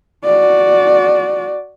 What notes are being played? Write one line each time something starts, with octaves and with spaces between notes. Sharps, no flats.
F#4 D5